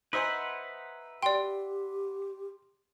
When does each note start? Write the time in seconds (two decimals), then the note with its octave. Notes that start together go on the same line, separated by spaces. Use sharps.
0.13 D#4 B4 C5 E5 F#5 G#5
1.22 G4 D5 G5 C6